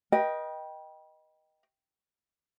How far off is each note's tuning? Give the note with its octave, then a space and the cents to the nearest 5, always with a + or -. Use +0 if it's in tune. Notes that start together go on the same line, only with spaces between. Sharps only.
B4 -40 D#5 +0 G5 +0